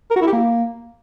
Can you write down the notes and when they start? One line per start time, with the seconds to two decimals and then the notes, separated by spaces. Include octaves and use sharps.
0.11 A#4
0.16 F#4
0.22 E4
0.27 G4
0.33 A#3